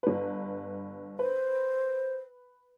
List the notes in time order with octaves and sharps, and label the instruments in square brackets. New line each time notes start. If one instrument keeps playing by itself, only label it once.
[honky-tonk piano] G1 B4
[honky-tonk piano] B4 [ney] C5